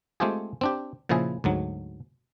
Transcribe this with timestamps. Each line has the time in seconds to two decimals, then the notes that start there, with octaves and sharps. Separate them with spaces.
0.20 G#3 A3 C4 F4 G4 G#4
0.61 C4 D4 G4
1.09 A#2 C#3 F3 E4 G#4
1.44 D2 G#2 F#3